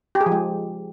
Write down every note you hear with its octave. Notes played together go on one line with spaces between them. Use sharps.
G4
G#4
F3
G#3